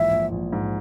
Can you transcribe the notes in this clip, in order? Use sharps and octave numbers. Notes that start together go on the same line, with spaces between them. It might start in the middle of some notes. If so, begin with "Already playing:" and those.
Already playing: A#1 G#2 E3 E5
A#1
A#1
G#2